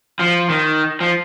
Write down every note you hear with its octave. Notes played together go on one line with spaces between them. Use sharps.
F3
D#3
F3